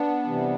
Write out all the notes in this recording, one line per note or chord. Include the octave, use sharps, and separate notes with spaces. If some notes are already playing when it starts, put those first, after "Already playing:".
Already playing: B3 D4
C3 E3 G3